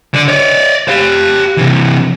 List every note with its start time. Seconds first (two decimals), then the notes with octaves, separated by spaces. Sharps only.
0.14 D3 D5
0.28 C#5 D5
0.89 G4 F5
1.57 C3 E3